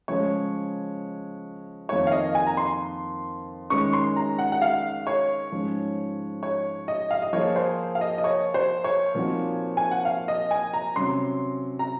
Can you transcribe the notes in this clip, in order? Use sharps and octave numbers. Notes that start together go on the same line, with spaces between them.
C#3 F3 G#3 C#5
F2 D#3 A#3 F4 C#5
F5
D#5
G#5
A#5
C6
D#3 G#3 C#4 C#6
C6
A#5
F#5
F#5
F5
C#5
G#2 F3 G#3 C#4
C#5
D#5
F5
D#5
F3 A#3 F4 G#4 C#5
C5
F5
D#5
D#5
C#5
C5
C#5
A#2 F3 C4 D#4 F#4
G#5
F#5
F5
D#5
G#5
A#5
C3 F#3 C#4 C6
A#5